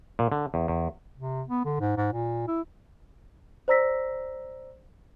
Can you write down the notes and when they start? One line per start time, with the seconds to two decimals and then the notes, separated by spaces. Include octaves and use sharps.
0.19 A#2
0.32 D3
0.54 E2
0.68 E2
1.18 C3
1.49 B3
1.65 D3
1.80 G#2
1.97 G#2
2.13 A#2
2.47 E4
3.68 C5 D5 A#5 E6 A#6 B6